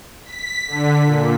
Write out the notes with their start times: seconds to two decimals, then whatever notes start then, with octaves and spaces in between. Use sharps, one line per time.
0.24 B6
0.67 D3
1.05 A#2